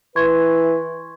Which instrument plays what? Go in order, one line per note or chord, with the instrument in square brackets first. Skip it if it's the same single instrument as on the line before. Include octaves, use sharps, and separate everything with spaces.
[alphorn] E3 [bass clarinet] B4 [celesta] C6 C#6 G#6